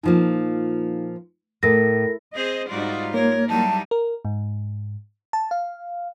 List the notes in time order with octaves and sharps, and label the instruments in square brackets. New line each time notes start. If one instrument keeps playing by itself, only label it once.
[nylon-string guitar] A#2 F3 A#3 [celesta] D#4
[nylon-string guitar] A2 [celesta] A4 A#4 A#6
[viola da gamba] C4 G#4 C5 [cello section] D#5
[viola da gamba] G#2 G3 F#4 [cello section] D#4 F4
[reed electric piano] A#3 [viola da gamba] A#4 [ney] C#5
[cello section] F#3 G3 E4 [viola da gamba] D#4 [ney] A5
[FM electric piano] A#4
G#2
A5
F5